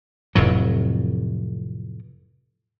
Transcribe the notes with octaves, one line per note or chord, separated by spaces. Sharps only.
F1 F2 A2 F#3